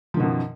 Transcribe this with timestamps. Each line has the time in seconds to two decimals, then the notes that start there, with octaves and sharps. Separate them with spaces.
0.14 F3
0.17 D#3
0.20 B2
0.23 F#2